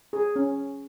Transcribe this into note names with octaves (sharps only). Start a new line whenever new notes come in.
G#4
C#4